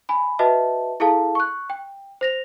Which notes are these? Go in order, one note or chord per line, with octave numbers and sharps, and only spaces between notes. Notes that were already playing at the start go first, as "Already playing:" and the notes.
G#5 B5
F#4 B4 D#5 E5 A5
E4 G#4 A4 F5 A5
C#6 F#6
G5
C5 A#6 F7